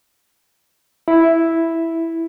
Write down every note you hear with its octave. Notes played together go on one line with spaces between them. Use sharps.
E4